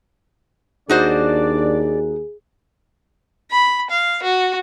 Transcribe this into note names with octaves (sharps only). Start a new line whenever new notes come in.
D#2 D4 D#4 F#4 G#4 C5 D5
B5
F5
F#4